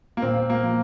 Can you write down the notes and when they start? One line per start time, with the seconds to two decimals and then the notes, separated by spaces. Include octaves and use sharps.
0.17 A#3
0.22 A#2 C4
0.50 A#3
0.64 F3